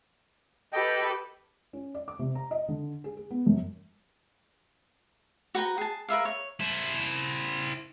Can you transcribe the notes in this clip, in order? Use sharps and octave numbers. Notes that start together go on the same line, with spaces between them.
G4 A4 B4 D#5 G5
C#4
D5
D6
C3
A#5
D#5
D3
G#4
G#4
B3
F#2
F#4 B4 G5 A#5
G#4 A5
A#4 B4 E5 F5
C#5
E4 C5